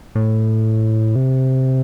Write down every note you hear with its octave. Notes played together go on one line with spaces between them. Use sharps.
A2
C3